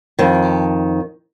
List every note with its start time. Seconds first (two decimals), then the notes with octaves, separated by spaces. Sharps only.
0.19 F2 D#3